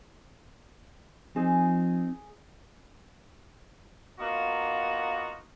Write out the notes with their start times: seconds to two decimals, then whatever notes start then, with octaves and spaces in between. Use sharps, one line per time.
1.36 F3 C4 D#4 G#4
4.19 A#3 B3 D#4 F4 F#4